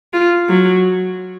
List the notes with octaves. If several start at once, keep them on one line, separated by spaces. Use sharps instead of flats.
F4
F#3